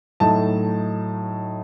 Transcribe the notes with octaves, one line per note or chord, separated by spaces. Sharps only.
A2 F#3 A3 D#4 A5